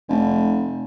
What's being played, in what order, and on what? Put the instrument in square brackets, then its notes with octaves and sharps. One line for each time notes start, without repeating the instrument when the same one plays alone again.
[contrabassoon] F1